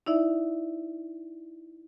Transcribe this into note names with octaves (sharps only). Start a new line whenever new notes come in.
D#4 E4 D5 E5